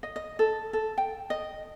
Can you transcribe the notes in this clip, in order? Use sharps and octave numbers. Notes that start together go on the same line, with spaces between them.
D#5
D#5
A4
A4
G5
D#5